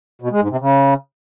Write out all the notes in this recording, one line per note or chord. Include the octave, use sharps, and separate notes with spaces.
B2
G#3
G#2
C3
C#3